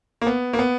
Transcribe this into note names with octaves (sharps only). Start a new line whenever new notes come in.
A#3
B3
A#3
B3